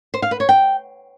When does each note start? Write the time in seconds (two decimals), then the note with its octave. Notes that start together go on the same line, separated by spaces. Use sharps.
0.14 C5
0.22 F5
0.31 B4
0.40 C#5
0.49 G5